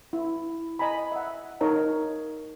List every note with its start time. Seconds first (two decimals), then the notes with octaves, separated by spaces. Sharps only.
0.13 E4
0.79 D#5 G#5 A#5 B5
1.12 E5 F#5
1.61 D#4 A#4 C#5 A#5